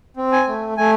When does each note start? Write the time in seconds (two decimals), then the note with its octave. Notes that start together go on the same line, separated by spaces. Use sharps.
0.17 C4
0.32 G#5
0.47 A3
0.77 A3 G#5